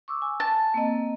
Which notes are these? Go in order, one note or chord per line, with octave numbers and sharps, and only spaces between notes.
C#6 D6 E6
G#5
A5
A#3 C4 D#5